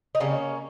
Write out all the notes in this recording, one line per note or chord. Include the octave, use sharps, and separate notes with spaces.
D#4
C#3 G3 A#3 C#4